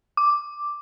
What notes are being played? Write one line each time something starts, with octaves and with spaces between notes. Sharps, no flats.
D6